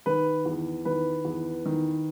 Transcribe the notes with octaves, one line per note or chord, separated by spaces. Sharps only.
D#3 B4
E2
D#3 B4
E2
D#3